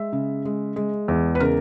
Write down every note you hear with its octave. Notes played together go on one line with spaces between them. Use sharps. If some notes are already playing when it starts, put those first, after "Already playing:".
Already playing: G#3 E5
C#3
G#3
G#3
E2
B4
C#3 A#4